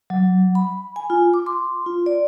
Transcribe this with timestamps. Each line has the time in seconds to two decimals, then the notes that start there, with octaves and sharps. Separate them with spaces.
0.10 F#3
0.55 B5
0.96 G#5
1.10 F4
1.34 D6
1.46 C6
1.86 F4
2.06 D5